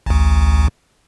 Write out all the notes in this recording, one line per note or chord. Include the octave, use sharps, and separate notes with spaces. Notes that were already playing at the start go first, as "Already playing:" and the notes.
A1 D2